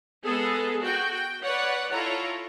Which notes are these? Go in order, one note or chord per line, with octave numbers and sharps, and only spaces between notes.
G#3 B3 G#4 A4
F#4 G5
G5
B4 C#5 D5 F#5
E4 F4 A4 C#5 A#5